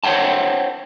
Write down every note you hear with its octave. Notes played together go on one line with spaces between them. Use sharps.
C5 C#5 F#5 G5 A5